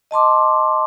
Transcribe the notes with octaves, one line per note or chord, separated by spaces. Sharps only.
D#5 A5 C6 D6